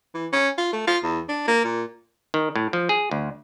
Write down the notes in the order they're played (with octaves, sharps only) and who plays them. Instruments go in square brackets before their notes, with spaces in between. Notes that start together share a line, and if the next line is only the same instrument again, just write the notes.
[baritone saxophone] E3
C#4
F4
A3
F4
E2
D4
A#3
A#2
[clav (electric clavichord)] D#3
A2
F3
G#4
D2